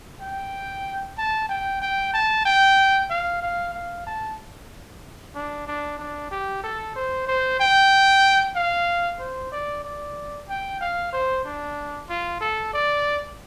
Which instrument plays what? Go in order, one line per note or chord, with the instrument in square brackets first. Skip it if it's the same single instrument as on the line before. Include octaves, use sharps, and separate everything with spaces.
[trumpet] G5
A5
G5
G5
A5
G5
F5
F5
F5
A5
D4
D4
D4
G4
A4
C5
C5
G5
F5
C5
D5
D5
G5
F5
C5
D4
F4
A4
D5